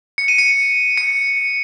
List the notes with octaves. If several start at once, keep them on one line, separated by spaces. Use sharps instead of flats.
C#7
D#7
C#7
C#7